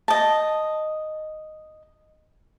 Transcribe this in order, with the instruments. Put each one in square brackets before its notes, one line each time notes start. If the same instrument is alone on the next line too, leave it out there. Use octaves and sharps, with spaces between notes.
[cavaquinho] D#5 A5